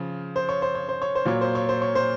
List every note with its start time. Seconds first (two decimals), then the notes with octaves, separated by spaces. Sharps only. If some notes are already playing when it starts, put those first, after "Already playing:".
Already playing: C#3 F3
0.36 C5
0.49 C#5
0.62 C5
0.75 C#5
0.89 C5
1.02 C#5
1.15 C5
1.25 A#2 F#3 C#5
1.41 C5
1.55 C#5
1.69 C5
1.82 C#5
1.95 C5